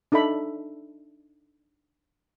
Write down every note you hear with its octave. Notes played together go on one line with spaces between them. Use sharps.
D4 D#4 A4 E5 B5